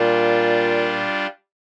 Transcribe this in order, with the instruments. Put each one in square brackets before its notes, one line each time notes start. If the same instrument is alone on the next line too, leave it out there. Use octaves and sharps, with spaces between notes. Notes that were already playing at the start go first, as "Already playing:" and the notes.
Already playing: [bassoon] A#2 [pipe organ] G3 D4 F4